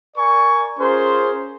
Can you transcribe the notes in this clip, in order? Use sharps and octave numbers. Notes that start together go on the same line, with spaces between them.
A#4 D5 G#5 C#6
C#4 F4 G#4 A#4 C5 C6